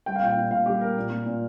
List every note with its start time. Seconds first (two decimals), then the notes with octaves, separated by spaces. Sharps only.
0.06 G3 G5
0.16 F5
0.22 A#2 G5
0.37 A#2
0.51 A#2 F5
0.66 G3 G4
0.81 A#3 A#4
0.97 A#2
1.11 A#2
1.26 A#2